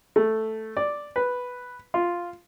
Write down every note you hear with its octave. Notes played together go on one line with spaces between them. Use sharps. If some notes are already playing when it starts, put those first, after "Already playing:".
A3
D5
B4
F4